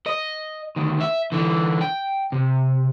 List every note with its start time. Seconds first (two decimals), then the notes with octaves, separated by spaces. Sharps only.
0.06 D#5
0.76 D2 D#3
1.01 E5
1.32 D3 E3
1.81 G5
2.32 C3